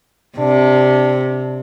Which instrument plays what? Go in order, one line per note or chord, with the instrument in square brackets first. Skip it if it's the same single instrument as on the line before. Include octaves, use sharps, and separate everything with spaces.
[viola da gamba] C3 [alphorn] D4